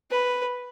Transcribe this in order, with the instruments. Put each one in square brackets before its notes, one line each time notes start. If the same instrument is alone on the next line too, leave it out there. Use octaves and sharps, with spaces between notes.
[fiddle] B4